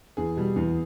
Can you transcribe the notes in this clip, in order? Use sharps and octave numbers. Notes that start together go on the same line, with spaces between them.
E2 G#4
B2 G3
E2